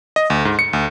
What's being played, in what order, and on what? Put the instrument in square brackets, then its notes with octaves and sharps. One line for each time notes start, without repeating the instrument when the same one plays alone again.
[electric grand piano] D#5
D2
G#2
C#7
D2